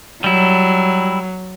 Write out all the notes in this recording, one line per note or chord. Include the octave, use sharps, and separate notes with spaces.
F#3 G3 E4